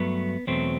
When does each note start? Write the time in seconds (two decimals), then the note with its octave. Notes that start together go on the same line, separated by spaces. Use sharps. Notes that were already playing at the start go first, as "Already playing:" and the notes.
Already playing: G2 F#3 A3 B3
0.47 E2 B2 F#3 A3 C4